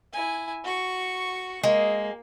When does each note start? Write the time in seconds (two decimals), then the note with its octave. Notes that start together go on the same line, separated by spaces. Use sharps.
0.12 E4 G#5
0.64 F#4 C#6
1.64 G#3 A#3